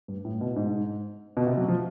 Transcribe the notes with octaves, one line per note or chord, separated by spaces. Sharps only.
G2
A2
B2
G#2
B2
C3
F#3
F3